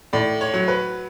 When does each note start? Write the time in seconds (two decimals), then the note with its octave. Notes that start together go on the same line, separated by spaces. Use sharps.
0.13 A2 D5
0.41 C#5
0.54 F#3
0.68 B4